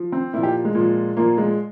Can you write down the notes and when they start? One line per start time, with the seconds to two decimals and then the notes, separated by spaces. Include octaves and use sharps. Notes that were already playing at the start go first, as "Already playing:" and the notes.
Already playing: F3
0.12 C4
0.33 A#2 F3 E4
0.43 G4
0.65 G#3
0.75 A#2 F3
1.17 A#2 F3 A#3
1.38 G#3